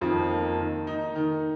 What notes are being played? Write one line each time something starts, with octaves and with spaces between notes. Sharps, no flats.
F2 D#3 F3
A#3
D#3
D#4
D#3